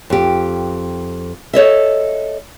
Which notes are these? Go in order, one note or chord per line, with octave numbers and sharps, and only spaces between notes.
F2 G4
A4 C#5 D#5 E5